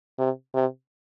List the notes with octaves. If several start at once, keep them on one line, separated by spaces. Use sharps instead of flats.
C3
C3